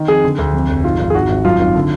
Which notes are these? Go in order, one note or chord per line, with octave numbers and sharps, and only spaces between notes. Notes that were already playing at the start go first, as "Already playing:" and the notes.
Already playing: D#3
F2 G#4
D3
D2
F2
F1
G#2 F4
G#1
G#4
G#2 F#4
G#1
F#2 F4
G#1
D3